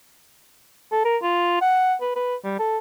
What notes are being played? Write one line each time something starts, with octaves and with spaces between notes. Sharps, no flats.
A4
A#4
F4
F#5
B4
B4
G3
A4